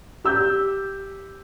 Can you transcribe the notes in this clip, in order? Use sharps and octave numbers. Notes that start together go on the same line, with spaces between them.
G4 E6 G6